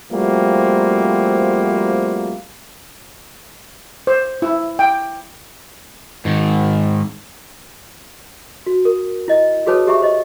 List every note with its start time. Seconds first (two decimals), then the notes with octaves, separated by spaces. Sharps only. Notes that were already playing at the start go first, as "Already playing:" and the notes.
0.12 F3 G3 A3 A#3 C4 F#4
4.07 C5
4.42 E4
4.79 G5
6.25 G#2 D#3
8.66 F#4
8.85 A#4
9.28 E4 D#5
9.66 F#4 G#4 B4 C#5 A5 D#6
9.87 G4 G#4 E5 A#5 C#6
10.02 C5 D#5